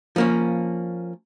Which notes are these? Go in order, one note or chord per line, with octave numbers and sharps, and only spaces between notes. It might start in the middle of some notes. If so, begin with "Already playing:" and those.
F3 A#3 C#4